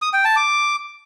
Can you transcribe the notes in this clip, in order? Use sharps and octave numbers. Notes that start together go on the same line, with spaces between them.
D#6
G5
A5
D6